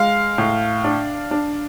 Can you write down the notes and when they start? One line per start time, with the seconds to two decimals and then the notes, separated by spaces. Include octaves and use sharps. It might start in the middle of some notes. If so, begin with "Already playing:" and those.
Already playing: G#3 F5
0.38 A2
0.84 D4
1.31 D4